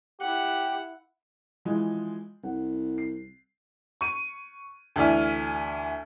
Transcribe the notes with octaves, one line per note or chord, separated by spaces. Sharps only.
E4 G4 F#5
E3 F3 G#3
C2 F#5
C7
C#6 D#7
D2 E3 D5 E5 G#5 F6